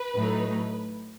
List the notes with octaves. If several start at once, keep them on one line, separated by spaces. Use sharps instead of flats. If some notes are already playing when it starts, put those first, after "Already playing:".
Already playing: B4
A2 F#3 A3 D#4